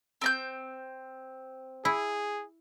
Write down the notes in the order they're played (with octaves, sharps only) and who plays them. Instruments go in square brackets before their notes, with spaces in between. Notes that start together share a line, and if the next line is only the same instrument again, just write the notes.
[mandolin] C4 A#5 G6
[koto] E4 [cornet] G#4